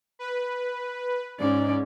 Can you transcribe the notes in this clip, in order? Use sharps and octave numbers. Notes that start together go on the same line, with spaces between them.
B4
G#2 C#4 D5